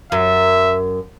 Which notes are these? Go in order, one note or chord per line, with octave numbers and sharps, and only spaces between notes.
F#2 E5